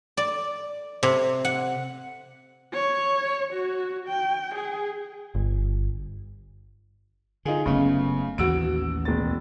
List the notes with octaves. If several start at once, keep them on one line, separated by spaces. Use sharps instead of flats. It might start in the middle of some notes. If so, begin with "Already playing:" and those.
D5
C3
F#5
C#5
F#4
G5
G#4
G1
D3 D#4 F4 G#4
F#1 C#3 A3 B3
A1 D#2 E3 F#4 E6 D7
E1 A6